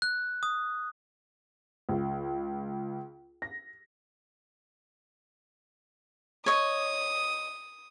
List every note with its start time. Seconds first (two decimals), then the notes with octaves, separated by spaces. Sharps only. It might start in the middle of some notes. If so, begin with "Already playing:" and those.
0.02 F#6
0.43 D#6
1.89 C#2
3.42 A#6
6.46 C#5 D#5 D#6